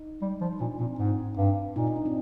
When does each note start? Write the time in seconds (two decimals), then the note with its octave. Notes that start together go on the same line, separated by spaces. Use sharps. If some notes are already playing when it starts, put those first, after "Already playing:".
Already playing: D#4
0.22 G3
0.41 F3
0.52 D#4
0.60 A#2 D4
0.79 A#2 C4
0.99 G#2 C4
1.38 G2
1.76 A#2 D#4
1.87 D#4
1.96 D4
2.06 C4